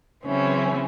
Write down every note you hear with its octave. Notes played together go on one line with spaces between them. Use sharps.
C#3 E3 F#3 C4 C#4 E4